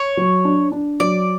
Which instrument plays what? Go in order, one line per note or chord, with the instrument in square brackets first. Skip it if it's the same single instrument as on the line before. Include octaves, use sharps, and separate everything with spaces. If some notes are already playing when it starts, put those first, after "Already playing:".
Already playing: [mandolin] C#5
[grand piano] F#3
D4
D4
[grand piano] F#3 [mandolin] D5